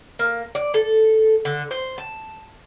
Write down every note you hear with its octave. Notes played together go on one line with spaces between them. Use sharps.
A#3
D5
A4
D3
C5
A5